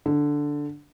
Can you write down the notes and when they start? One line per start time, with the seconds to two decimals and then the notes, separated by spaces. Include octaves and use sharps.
0.06 D3